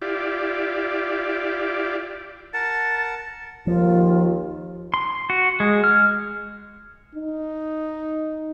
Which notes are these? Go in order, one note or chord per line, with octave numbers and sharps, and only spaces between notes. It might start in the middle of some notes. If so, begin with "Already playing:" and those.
E4 F4 G4 D5
A#4 F#5 A5 A6
D#2 F3 F4
C6
F#4
G#3
F6
D#4